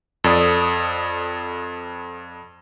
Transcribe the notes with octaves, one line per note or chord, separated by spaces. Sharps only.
F2 A4 D5 D#6